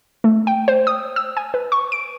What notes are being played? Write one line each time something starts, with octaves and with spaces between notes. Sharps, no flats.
A3
G5
C5
D#6
E6
G#5
B4
C#6
D7